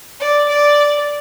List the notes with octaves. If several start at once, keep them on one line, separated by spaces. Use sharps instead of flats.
D5
D5